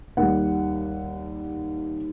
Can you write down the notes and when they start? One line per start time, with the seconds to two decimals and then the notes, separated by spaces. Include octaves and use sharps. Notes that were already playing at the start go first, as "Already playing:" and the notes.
0.17 D#2 D#3 G3 F#5